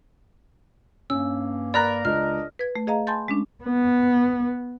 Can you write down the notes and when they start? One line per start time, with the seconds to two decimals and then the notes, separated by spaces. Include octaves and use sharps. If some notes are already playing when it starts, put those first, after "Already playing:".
1.10 G2 A#3 C#4 E6
1.74 A#4 D5 A#5 B5 F#6
2.05 C#2 D4 D#5 F6
2.59 B4 G#6
2.75 A3
2.87 G#4 D#5 F5 A#5
3.07 G#5 A5 B5 C6 G6 A6
3.28 G#3 C#4 D4
3.64 B3